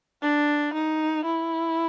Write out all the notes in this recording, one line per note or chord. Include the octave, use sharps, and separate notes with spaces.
D4
D#4
E4